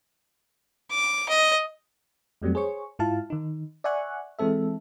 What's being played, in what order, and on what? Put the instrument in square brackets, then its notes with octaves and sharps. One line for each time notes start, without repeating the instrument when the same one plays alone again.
[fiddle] D6
D#5
[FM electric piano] F2 F#3 G3 A3 C4
G#4 C5 C#5 C#6
G#2 E4 F4 F5 A5
D#3 D#4
D5 E5 F#5 G#5 C#6 F#6
E3 G#3 C4 A4 E5